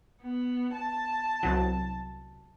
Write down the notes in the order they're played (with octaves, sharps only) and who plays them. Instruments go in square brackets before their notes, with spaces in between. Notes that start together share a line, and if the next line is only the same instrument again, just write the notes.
[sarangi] B3
A5
[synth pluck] C2 F#3